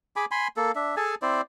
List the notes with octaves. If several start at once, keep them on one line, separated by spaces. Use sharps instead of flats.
G#4 G#5 B5 D6
G#5 B5 C6
A#3 A4
D4 E5
G#4 A4 G#5 A5
C4 E4 C5 D5